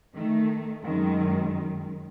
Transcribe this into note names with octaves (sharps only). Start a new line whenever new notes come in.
D#3 A3
F#2 D#3 G#3